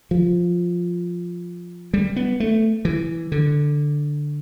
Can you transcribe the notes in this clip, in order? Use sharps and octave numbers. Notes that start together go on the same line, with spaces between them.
F3
G3
B3
A3
E3
D3